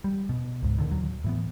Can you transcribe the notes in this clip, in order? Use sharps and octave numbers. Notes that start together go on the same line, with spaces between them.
G3
B2
C#2 G#2
A#2 D3 D#3
D#2 F#3
A2 E3 B3